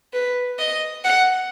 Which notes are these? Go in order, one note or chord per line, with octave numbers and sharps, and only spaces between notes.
B4
D#5
F#5